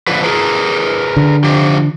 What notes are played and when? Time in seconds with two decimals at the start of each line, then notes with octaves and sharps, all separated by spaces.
0.07 D3 F3 B4
0.24 G#4 A#4 B4
1.16 D3
1.44 F3 G4